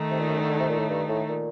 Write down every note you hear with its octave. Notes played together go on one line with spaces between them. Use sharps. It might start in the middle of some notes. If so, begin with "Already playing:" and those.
Already playing: D#3 A3 D#4
C3
A#2
F#2
D3
D3
C3
A#2
A2
G2
A2
A#2